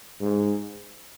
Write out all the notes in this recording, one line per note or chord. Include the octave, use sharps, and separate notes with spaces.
G#2